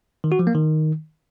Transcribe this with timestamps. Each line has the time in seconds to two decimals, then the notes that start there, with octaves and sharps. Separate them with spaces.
0.24 D#3
0.32 F#4
0.39 F3
0.47 A#3
0.55 D#3